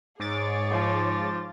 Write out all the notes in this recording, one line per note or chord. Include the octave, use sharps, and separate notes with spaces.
G#2 G#4 C#5 D6 A6
F3